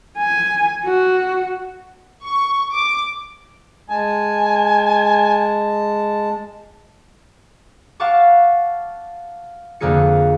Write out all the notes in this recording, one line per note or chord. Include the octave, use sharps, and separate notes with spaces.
G#5
F#4
C#6
D6
G#3 G#5 A5
F5 F#5 A5 C#6 D6
F2 D3 A#3 G#4 C#7